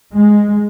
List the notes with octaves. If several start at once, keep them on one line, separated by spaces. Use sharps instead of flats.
G#3